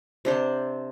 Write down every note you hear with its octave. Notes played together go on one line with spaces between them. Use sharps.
C3 D4 C5